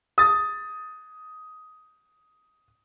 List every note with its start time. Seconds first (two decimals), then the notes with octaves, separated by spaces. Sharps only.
0.18 D#6 A6